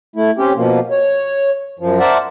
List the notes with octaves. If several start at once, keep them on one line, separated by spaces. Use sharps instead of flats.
A3 E4
C4 C#4 G4
B2 F3 A#3
C#5
F#2 F3
A#4 C5 D5 E5 F#5 A5